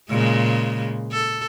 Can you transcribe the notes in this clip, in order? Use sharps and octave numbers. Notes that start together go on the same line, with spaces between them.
A#2 C#3 G#3
A4